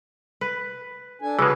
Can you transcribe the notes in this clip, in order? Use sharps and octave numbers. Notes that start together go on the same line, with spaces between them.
B4
D4 A4 G#5
C#3 E3 G#3 F#4 A4 B4